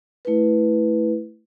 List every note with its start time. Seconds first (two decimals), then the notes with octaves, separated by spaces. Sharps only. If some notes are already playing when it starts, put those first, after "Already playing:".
0.25 A3 E4 B4